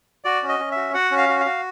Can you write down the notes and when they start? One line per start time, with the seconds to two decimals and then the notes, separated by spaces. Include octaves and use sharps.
0.25 F#4 D5
0.43 C#4
0.49 D#5
0.59 C#4
0.71 F#4 E5
0.94 F#4 F#5
1.11 C#4
1.17 F5
1.29 F#4
1.40 F5
1.46 F#4